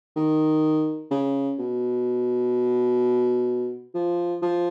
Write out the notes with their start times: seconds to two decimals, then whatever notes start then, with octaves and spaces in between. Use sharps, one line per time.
0.16 D#3
1.11 C#3
1.59 B2
3.94 F3
4.42 F3